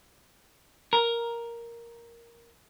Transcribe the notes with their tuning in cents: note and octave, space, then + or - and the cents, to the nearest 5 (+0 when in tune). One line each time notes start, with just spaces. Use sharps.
A#4 +5